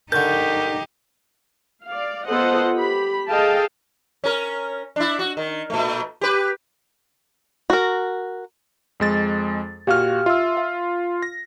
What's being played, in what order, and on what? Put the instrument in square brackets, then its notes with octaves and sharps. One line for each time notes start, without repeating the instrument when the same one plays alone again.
[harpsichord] D3 A5 [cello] D#4 G4 [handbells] A#4 C#6 [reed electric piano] G6
[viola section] D5 F5
B3 F4 A4 C5 D#5 F#5
G4 B5
G#4 A4 D#5 F5 G5 A5
[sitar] C#4 A#4
D4 E4
F#4
D#3
A#2 A3
G4 B4
[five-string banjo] F#4 A#4
[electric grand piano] F2 G#3 A6
[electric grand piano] A#2 F#4 F6 [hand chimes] G4 F5
[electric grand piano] F4 [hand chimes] E5 E6
[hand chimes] F5
[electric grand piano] A#6